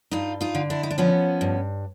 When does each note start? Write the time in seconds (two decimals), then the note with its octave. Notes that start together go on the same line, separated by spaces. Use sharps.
0.11 G2 D#4 F4
0.41 D#4 F4
0.55 D3
0.70 D4 E4
0.83 D#4
0.91 D4
0.98 F3 B3 C#4
1.41 G2